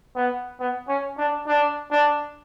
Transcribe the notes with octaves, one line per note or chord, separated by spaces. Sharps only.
B3
B3
C#4
D4
D4
D4